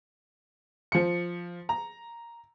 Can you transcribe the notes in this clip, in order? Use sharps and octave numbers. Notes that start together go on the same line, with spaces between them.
F3 C#7
A#5